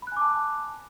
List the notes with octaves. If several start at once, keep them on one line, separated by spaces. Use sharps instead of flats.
G#5 A5 B5 D6 F#6